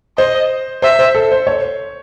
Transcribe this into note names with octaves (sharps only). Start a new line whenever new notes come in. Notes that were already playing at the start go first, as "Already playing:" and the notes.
C5 D#5
C5 E5
C5
A4
C5
C#5